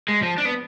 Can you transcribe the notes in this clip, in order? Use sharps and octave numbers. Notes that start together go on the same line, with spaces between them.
G#3
F3
D4
B3